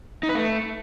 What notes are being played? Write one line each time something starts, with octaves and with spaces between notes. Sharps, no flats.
D#4
B4
A3